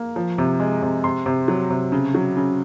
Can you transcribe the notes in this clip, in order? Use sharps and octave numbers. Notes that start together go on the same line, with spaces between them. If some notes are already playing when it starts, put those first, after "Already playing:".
Already playing: A#3
F3
C3
G#3
C3
C3 C6
C3
F#3
C3
C#3
F#3
C#3